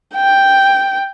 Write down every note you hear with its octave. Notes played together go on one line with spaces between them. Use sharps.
G5